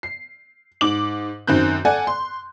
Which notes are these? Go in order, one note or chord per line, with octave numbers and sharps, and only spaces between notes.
C7
G#2 D6 F#7
F#2 D#3 C4 F#6 G6
A4 D5 F#5 G#5
C6